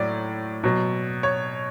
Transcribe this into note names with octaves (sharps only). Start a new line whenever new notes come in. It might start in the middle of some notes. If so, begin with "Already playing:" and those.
Already playing: A2 F#3 D5
B2 F#3
C#5